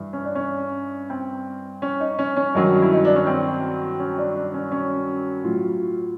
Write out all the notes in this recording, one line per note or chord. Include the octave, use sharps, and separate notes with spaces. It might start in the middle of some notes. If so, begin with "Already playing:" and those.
Already playing: G2 E3
C#4
D4
C#4
C4
C#4
D#4
C#4
C#4
G2 D#3 F#3
E4
D#4
D4
C#4
C4
C#4
D4
D4
C#4
C#4
A2 F#3 F4